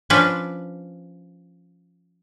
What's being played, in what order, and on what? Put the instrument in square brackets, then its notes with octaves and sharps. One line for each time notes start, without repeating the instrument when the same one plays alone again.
[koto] F3 C#4 D4 B4